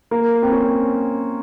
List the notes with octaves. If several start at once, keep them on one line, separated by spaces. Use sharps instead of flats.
A#3
C4
C#4